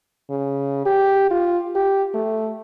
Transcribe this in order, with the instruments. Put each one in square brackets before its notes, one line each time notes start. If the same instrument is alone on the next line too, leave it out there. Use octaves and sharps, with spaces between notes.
[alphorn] C#3
G4
F4
G4
A3